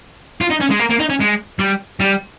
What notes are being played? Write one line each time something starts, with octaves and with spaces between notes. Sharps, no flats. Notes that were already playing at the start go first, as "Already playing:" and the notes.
F4
D#4
C#4
G#3
A#3
A#3
D#4
C#4
G#3
G3
G3